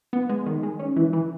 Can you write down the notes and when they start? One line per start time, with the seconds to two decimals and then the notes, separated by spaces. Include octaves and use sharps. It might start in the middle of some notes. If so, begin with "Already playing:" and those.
0.13 B3
0.29 G#3
0.46 D#3
0.63 G#3
0.80 C#4
0.96 E3
1.13 E3